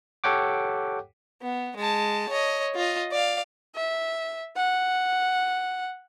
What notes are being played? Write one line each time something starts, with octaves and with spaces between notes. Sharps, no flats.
G4 A4 C#5 F#5 G5 D6
B3
G#3 A5
C#5 D#5
F4 D#5
D5 F5
E5
F#5